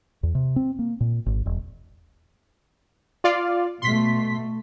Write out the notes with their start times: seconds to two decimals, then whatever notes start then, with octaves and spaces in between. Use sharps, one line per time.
0.23 E2
0.35 C3
0.56 C4
0.79 A#3
1.01 A#2
1.26 G#1
1.46 E1
3.24 F4 D5 F5
3.82 B2 A3 C6 B6